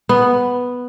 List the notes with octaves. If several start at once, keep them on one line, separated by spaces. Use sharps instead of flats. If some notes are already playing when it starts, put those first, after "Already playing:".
B3